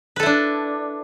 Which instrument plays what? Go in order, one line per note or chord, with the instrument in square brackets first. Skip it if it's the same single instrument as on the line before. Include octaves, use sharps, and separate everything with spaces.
[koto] B4
A4
E4
D4